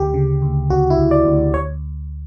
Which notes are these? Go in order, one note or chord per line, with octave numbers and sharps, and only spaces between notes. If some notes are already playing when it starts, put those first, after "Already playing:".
Already playing: D2 G4
C#3
D2
D2 F#4
E4
D2
D5
D2
D2 C#5